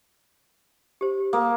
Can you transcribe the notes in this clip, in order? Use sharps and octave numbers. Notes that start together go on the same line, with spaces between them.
G4 C5
A#3 D#6